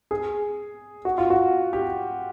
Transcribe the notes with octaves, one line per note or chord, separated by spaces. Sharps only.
G#4
F#4
F4
F#4
G4